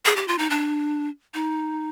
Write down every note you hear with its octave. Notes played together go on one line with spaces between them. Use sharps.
G#4
G4
F4
D#4
D4
D#4